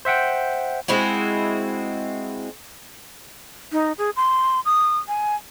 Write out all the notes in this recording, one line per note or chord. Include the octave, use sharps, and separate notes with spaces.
C5 E5 F#5 G5
G#3 C4 E4 F#4
D#4
G#4
C6
D#6
G#5